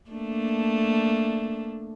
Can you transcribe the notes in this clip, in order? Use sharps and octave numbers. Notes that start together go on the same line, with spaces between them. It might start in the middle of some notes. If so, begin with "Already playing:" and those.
A3 A#3 D4